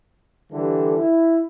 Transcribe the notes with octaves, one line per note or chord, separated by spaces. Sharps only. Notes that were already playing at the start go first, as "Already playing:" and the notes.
D3 E3 G3 G4 A4
E4